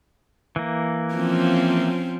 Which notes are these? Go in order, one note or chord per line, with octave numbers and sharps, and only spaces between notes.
E3 A#3
F3 C4 C#4